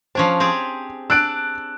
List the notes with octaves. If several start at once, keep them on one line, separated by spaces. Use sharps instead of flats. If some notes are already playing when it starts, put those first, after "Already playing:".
F3 C#4 D4 C5
C4 G4 G#4
D4 D5 E6 F#6 D7